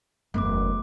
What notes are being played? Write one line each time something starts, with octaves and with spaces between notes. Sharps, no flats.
F#1 E2 A3 B3 D6